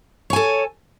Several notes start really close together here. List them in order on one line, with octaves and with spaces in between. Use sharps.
C#5 G#5 A4